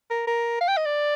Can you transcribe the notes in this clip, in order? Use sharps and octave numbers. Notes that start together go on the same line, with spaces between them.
A#4
A#4
F5
G5
D#5
D5